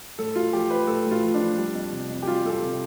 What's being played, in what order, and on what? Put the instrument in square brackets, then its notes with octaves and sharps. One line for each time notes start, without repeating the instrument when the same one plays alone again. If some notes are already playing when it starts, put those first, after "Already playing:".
[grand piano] A2 A4
A2 F4
F3 G4
F3 B4
A2 A4
A2
F4
F3
D4
F3
G3
F2
C3
F2
G4
G3 F4
F2 A4
G4
C3